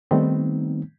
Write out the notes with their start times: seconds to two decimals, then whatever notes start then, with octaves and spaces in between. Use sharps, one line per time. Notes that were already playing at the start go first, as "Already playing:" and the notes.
0.11 D#3 G3 A3 B3 C4 D#4